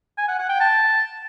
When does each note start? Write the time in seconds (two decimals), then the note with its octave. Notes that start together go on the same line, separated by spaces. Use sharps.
0.18 G#5
0.28 F#5
0.39 F#5
0.49 G5
0.60 A5